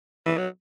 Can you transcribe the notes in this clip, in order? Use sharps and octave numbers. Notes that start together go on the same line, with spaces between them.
E3
F#3